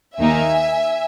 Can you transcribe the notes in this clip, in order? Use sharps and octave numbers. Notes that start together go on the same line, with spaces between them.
D#2 D#3 A#3 D#4 A#4 E5 G#5